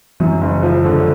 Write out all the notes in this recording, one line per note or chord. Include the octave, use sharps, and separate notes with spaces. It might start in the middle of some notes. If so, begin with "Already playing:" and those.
F#2 E3
F#1
F3
D3